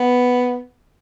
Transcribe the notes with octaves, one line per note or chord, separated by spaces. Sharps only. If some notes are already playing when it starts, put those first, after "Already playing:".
Already playing: B3